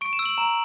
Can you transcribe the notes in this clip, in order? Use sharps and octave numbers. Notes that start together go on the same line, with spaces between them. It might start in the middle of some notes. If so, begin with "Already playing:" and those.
C#6 D7
E7
E6
F#7
A#5 E7